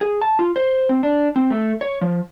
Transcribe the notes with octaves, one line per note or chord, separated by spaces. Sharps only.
G#4
A5
F4
C5
C4
D4
C4
A3
C#5
F3